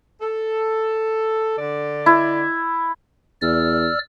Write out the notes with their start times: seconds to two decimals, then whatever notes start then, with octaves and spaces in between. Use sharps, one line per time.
0.22 A4
1.58 D3 D5
2.06 E4
3.42 E2 D5 E6 F6